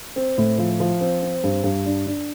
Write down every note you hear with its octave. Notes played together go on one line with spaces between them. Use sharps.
C4
A2
F3
F3
C4
C4
G2
G2
D4
D4